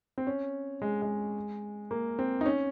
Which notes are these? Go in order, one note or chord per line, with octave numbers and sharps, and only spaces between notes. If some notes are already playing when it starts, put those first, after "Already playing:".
C4
C#4
G#3
G#3
A#3
C4
D#4
C#4